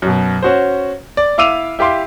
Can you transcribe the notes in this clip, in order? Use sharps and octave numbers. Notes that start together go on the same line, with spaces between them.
F#2 B2
C#4 F#4 C5
D5
E4 F5 D6 E6 D#7 F7
E4 G4 F5 C6 D6